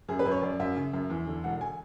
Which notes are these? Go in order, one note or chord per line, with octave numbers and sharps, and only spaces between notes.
F#2 G#4
B4
F#2
C#5
F#2 D5
F#2 E5
C#3
F#2
E2
D3
E1 F#5
G#5